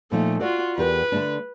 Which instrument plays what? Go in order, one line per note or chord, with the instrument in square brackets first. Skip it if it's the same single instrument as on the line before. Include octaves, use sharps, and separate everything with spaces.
[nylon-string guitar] A#2 F3 D#4 [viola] A3
[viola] F4 F#4 [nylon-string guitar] D5
[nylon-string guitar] E2 G4 A#4 [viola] B4
[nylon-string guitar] D3 A3 D4